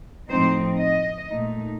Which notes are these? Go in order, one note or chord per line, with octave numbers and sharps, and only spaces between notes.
A2 F3 C4 D#4 C5
D#5
A#2 A3 D#4